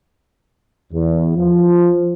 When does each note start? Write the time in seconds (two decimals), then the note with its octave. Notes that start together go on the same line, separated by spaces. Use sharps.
0.93 E2
1.36 F3